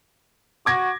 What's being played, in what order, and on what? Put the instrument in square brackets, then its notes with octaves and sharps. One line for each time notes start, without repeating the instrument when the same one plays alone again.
[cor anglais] F#4 [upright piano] D6 G#6 A#6